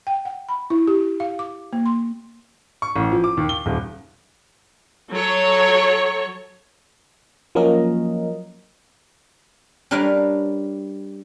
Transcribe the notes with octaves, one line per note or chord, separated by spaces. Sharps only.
G5
F#5
B5
E4
G4
F5
D6
A#3
C6
C#6
A1
F3
D6
D#2
G7
D#1
F#3 A4 C#5
F3 F#3 A#3 C#4 A#4 D#5
G3 D4 A#4 B4 C#5 F5